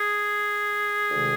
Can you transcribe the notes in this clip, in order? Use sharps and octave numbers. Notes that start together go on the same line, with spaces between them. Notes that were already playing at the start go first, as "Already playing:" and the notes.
Already playing: G#4
D2 C3 D#3 G#3